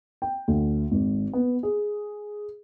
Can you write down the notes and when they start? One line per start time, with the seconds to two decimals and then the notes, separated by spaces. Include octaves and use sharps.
0.22 G5
0.48 D2
0.92 G#1
1.33 B3
1.63 G#4